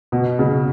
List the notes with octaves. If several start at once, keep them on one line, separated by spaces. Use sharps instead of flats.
B2
C#3